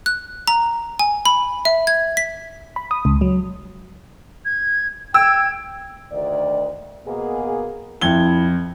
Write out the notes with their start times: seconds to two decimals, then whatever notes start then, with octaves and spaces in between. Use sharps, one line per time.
0.06 F#6
0.48 A#5
0.99 G#5
1.26 B5
1.65 E5
1.87 G#6
2.17 B6
2.76 B5
2.91 D#6
3.05 C#2
3.21 F#3
4.45 G#6
5.14 G5 E6 G#6
6.12 D2 D#3 D5
7.06 B2 A#3 G#4
8.01 F2 E4 G#6 G7